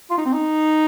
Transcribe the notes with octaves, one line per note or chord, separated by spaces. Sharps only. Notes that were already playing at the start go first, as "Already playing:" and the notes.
F4
D#4
C4
D#4